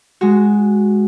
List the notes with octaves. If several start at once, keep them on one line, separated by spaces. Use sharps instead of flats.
G#3 F#4